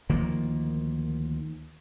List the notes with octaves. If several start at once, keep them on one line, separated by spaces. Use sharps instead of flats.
D2 D#3 F3 A#3